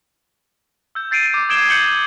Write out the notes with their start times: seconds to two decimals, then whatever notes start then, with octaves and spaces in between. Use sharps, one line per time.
0.95 E6 G6
1.11 G6 A6 C7 D7 D#7
1.33 D6 G6
1.49 D#6 G#6 D7 E7 G7
1.69 G6 A6 C#7 F#7 G7